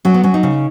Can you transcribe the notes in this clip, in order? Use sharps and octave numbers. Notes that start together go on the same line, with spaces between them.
F#3 C#4
B3
F#3 C#4
D#4
C#3